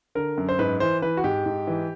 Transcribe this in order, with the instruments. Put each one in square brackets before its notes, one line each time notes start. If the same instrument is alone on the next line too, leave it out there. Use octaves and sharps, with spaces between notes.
[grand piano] D3 A#4
F#2
C5
G#2 B4
E3 C5
E3 B4
F#4
G#2 G4
G#2
E3